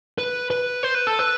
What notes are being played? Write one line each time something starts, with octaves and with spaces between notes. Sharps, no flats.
B4
B4
C5
B4
A4
B4